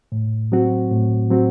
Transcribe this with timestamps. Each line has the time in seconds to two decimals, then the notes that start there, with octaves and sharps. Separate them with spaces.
0.12 A2
0.52 F#3 C4 F#4
0.91 A2
1.30 F#3 C4 F#4